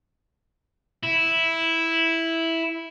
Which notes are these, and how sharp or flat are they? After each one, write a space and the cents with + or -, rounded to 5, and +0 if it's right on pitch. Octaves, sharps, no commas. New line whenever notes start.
E4 -5